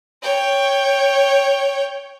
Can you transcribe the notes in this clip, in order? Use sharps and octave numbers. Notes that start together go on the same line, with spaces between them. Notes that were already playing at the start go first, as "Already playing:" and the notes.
C#5 G5